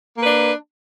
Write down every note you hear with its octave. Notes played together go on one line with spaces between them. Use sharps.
A#3 D4 B4